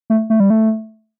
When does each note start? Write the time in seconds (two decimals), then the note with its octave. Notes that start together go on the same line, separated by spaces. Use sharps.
0.10 A3
0.30 A3
0.40 G3
0.50 A3